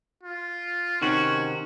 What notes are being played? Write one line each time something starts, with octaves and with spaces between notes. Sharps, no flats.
F4
C3 D#3 C#4 F#4